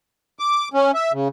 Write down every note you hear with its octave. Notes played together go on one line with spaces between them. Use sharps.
D6
C#4
E5
C#3